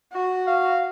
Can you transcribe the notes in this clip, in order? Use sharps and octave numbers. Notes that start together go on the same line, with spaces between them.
F#4
F5